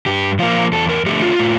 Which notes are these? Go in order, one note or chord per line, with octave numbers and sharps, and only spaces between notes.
G2 G4
F3 A#3 F4
E2 A4
A#4
D3 A3 G4
F4
A2